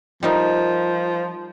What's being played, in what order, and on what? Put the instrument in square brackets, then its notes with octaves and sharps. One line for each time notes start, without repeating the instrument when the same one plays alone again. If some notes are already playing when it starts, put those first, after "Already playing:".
[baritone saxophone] F3 [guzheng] G3 D#4 A#4